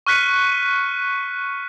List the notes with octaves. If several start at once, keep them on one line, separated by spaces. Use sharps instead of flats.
C#6 F6 F#6 B6 C#7 D#7